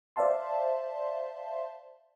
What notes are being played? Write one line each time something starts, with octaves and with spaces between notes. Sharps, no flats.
C5 D5 E5 F5 A5 C6